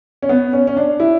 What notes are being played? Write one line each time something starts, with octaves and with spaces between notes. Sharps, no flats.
C#4
B3
C#4
C#4
D4
E4